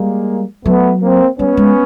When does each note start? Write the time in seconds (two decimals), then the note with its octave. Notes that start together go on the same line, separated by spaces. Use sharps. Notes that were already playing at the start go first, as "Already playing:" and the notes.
Already playing: G3 G#3 A#3
0.65 F#3 A3 B3
1.02 A#3 C4
1.39 G3 B3 C#4
1.57 G#3